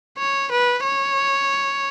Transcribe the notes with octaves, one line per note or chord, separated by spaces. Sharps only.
C#5
B4
C#5